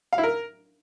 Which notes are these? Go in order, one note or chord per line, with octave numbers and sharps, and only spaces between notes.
F5
E4
A#4